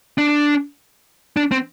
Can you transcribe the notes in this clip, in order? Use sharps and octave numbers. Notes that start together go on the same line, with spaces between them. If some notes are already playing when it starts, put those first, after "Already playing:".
D4
D4
C4